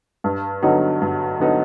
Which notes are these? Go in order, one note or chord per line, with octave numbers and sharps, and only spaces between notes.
G2
D3 F#3 B3 D#4
G2
D3 F#3 B3 D#4